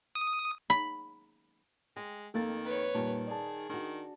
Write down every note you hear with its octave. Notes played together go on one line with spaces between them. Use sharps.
D#6
B5
G#3 G5
F2 D#3 A#3 A4 F5 A6
B4 C#5
A#2 D#3 G3 A5
G#4 D5 A5
D#3 D4 F#4